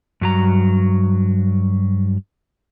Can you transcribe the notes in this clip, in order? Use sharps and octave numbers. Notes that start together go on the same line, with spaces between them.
G2 F#3 A#5